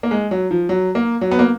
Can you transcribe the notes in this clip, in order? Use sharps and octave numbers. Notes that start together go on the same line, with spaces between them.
A#3
G#3
F#3
F3
F#3
A#3
F#3
B3
A#3